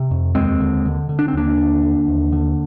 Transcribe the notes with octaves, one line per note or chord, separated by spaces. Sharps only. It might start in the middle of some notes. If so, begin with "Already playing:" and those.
Already playing: C3
F2
D#2 G#3 C4
D3
D3
D3
D4
C4
D#2 A#3 D4
D3
D3
D#2
D3